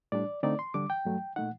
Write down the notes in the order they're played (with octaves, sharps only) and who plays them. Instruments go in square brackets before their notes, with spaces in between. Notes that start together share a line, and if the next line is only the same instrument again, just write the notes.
[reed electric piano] A2 G3 D4 D5
D3 A3 C4 D#4 D5
C6
D3 G3 D4 D6
G5
G2 F#3 A3
A#2 A3 D#4 F#5